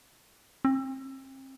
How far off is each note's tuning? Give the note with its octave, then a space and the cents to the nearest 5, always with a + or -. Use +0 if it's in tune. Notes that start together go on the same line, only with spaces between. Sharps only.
C4 +35